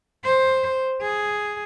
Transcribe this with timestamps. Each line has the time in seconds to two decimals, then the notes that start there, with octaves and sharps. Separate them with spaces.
0.24 C5
1.02 G#4